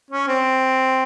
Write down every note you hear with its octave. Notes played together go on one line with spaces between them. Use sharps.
C#4
C4